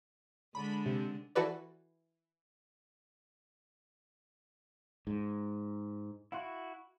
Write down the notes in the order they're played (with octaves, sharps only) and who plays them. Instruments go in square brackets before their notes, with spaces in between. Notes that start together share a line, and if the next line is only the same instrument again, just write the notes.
[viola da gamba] D3 G#3 D4 [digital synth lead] B5
[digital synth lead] C3
[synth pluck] E3 F#4 A4 B4 D5
[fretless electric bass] G#2
[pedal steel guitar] E4 F#4 [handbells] F5 F#5 C6